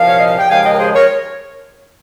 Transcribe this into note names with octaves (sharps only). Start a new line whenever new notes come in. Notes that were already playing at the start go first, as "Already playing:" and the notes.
Already playing: C2 A#2 F3 F5
C#5
D#5
F5
G5
D#2 C#3 F3 G#3 F5 G#5
D#5 G5
A#4
G#4 C5
A#4 C#5